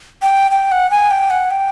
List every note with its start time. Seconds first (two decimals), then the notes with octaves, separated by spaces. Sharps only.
0.22 G5
0.51 G5
0.72 F#5
0.91 G#5
1.11 G5
1.30 F#5
1.50 G5